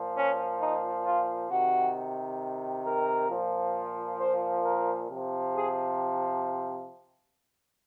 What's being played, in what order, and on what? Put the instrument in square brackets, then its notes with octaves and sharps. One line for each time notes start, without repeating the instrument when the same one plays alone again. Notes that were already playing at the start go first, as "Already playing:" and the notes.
Already playing: [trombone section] A#2 F3
C#4
D#4
F4
C3 D#3 F#4
A#4
A#2 F3
C5
A#4
C3 F3
G#4